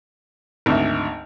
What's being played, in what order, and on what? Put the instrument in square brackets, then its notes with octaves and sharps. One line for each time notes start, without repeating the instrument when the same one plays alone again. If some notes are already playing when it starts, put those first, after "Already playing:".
[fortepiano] G#1 D2 E5